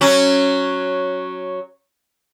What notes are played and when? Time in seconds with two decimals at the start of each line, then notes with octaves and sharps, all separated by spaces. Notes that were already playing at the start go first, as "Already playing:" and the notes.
0.01 F#3 C#4